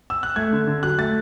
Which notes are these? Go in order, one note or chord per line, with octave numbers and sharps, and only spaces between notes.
E6
F#6
A3 G#6
D3
D3
F#3 F#6
A3 A6